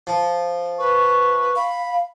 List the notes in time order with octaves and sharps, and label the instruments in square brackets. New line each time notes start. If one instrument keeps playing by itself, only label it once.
[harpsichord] F3
[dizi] B4 [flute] C#6
[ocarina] F5 [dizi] B5